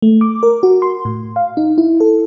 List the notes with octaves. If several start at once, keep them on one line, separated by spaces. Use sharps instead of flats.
A3
D6
A#4
F#4
C6
A2
F5
D#4
E4
A4